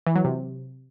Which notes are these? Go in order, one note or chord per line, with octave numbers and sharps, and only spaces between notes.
E3
F#3
C3